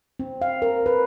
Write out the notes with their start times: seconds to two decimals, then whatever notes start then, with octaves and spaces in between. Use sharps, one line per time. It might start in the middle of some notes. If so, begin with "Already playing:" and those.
0.20 C4
0.42 F5
0.62 A#4
0.86 B4